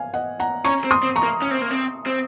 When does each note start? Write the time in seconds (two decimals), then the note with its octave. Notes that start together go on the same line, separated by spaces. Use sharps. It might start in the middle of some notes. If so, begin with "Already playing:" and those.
Already playing: F5 G#5
0.14 D#5 F#5
0.40 F#5 A#5
0.65 C#4 A#5 C#6
0.84 C4
0.91 C6 D#6
1.03 C4
1.16 A#5 C#6
1.23 A#3
1.42 C#4
1.51 C4
1.62 A#3
1.71 C4
2.06 C4